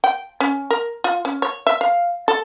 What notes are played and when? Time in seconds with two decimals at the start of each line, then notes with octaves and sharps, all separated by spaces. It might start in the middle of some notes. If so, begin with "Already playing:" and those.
0.04 G5
0.40 C#4
0.70 A#4
1.04 F4
1.25 C#4
1.42 C#5
1.67 E5
1.81 F5
2.28 A4